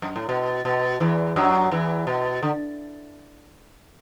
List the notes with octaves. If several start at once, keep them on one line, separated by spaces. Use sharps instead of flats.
F#2
A2
B2
B2
E2 E3
F#2 F#3
E2 E3
B2
D3